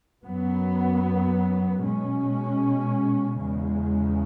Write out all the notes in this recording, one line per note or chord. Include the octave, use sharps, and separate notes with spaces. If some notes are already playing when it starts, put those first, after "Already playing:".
F#2 F#3 B3
B2 G#3 C#4
E2 C#3 G#3